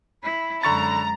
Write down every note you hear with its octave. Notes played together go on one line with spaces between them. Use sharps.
E4 B5
F#2 D3 G#3 A#5 C#6 A6